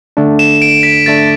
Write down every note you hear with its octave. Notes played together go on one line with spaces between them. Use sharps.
D3 A3 D4
E7
D7
B6
D3 A3 D4 A6